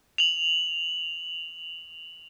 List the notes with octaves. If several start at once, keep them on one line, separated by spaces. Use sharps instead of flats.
F7 F#7